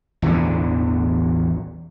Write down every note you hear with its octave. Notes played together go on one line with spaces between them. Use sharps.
A1 E2 B2 D3